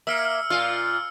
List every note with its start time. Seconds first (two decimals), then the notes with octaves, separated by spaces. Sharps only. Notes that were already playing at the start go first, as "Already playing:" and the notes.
0.07 A#3 E5 E6 F6 C#7
0.50 A#2 F4 F5 F6